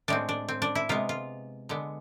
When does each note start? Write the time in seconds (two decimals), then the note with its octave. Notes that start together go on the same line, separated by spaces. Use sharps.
0.08 A2 G#3 C4 D4
0.29 D4
0.48 C4
0.62 D4
0.75 E4
0.89 C3 G#3 B3 F4
1.09 F4
1.69 D3 G#3 B3